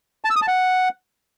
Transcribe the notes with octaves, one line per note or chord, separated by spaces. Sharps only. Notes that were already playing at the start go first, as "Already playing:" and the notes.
A5
E6
D#6
A5
F#5